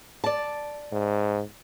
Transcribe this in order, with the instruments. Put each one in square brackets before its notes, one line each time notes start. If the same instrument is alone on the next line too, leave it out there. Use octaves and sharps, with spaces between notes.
[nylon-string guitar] D5 A5
[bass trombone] G#2